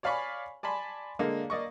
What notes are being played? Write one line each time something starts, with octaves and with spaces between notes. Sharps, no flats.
C#5 D5 F5 G#5 B5 C#6
D5 G#5 A5 B5 C6
D3 G#3 A#3 D4
A#3 D5 D#5 C#6